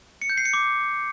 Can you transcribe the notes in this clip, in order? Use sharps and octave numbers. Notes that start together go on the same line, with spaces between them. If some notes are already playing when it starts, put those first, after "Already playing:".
C#7
G6
C7
C#7
D6